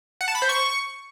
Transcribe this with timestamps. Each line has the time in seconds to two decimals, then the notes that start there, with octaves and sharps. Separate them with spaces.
0.21 F#5
0.28 A5
0.35 B5
0.42 C5
0.49 C#6